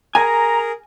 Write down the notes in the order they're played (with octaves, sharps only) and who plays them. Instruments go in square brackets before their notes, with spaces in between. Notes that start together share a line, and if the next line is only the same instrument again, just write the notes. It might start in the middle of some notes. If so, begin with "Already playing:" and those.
[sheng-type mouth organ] G#4 A#4 [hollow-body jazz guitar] G#5 [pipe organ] A#5